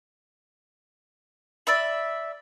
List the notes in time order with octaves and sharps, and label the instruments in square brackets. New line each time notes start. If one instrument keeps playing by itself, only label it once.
[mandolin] D5 E5 B5